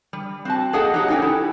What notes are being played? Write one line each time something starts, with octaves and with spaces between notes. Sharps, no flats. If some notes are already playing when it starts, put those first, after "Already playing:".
G3
C4 F#4 A5
A#3 G#4 A4 D#5 F#5 A5
F#3 D#4 G4 D#5 F#5
C#4 D#4 G4 C5 G5 G#5
E4 A4